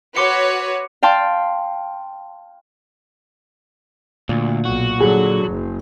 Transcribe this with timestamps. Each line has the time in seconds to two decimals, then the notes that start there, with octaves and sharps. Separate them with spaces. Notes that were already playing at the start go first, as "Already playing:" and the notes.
0.17 F#4 B4 C#5 C6 D6 C#7
1.03 F5 G5 A5 C6
4.29 D2 A#2
4.65 B1 F#4
5.00 D3 F#3 G#4
5.49 F#1